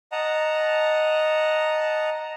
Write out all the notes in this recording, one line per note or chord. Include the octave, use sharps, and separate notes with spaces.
D#5 F#5 A5 A#5